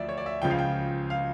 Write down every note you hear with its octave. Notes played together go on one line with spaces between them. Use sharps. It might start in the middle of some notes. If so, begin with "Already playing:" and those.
Already playing: D2 F3 D5 E5
C#5
D5
E5
C#2 C#3 F3 G5
F5
G5
F5